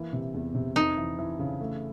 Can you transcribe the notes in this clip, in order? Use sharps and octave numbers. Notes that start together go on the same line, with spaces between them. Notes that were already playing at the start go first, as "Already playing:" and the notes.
Already playing: E3 A#3
C3
E2
C3
F2 D#4
E3
E3
C#3
A3